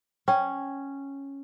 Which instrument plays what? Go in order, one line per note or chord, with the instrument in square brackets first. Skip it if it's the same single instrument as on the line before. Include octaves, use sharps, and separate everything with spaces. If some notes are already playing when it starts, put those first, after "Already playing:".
[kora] C#4 [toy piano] G5